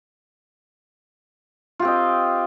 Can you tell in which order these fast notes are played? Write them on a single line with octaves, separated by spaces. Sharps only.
F4 G4 C4 D#5